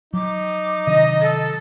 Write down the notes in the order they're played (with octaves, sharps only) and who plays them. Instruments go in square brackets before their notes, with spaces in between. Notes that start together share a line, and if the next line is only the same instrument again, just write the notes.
[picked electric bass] F#3 [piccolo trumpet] D#4 [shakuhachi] D6
[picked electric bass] C3 D#3 F#3 [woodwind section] D#5
[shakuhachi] A4